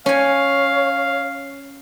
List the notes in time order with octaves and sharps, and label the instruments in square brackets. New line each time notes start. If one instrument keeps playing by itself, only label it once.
[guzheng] C#4 G#5 [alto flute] C#5 [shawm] F5